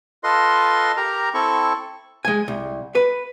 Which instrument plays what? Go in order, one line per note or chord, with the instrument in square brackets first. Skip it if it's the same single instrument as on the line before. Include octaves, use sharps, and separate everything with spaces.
[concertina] F4 A4 B4 D#5 C6
G4 A#4 A#5
C4 E4 A4 C#6
[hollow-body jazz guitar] G#3 G#5
C2
B4